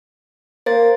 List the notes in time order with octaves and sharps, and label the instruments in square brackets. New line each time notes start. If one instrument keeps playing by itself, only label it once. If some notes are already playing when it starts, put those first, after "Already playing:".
[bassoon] A#3 [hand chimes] C5 A6